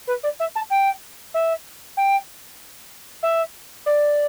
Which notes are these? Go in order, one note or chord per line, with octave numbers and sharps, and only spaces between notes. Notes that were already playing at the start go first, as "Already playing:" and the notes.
B4
D5
E5
A5
G5
E5
G5
E5
D5